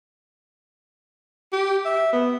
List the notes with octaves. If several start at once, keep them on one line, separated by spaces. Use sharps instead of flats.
G4
E5
B3